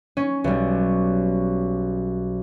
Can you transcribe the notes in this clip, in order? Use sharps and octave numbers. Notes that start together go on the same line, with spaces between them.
C#4
B1 G3